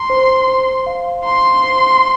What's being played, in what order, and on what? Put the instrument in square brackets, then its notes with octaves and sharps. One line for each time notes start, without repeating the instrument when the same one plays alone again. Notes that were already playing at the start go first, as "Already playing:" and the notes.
Already playing: [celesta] A#5 [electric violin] C6
[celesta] C5
C5
F5
[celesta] A#5 [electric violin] C6
[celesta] C5